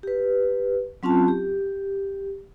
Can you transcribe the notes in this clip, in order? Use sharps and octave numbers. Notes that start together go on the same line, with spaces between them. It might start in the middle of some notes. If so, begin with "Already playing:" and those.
G4 B4
F#3 C4 C#4 F4 A5
G4